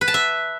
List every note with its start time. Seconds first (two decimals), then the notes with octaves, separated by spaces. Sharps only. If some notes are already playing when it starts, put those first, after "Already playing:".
0.01 B4
0.08 A5
0.14 E5